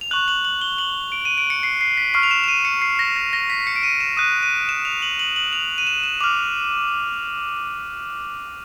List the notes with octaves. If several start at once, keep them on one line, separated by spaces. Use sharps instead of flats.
F7
C#6 F#6 F#7
F#7
F#7
G7
F#7
D7
D#7
D7
C#7
C7
C7
B6
C#6 F6 C7
F7
E7
E7
D#7
C#7
C7
A#6
A#6
A#6
B6
C#7
D7
D#7
E7
D#6 F#6 D#7
D#7
E7
F7
F#7
F#7
F#7
F7
D#7
E7
E7
D6 F6 F7